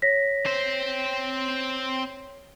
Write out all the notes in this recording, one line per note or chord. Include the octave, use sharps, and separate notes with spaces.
C#5 A#6 B6
C4 C5